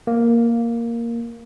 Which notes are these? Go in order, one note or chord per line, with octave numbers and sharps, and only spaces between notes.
A#3